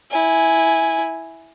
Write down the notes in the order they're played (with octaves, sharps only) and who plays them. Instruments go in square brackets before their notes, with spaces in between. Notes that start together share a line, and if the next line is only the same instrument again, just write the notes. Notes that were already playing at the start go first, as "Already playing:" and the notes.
[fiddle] E4 G#5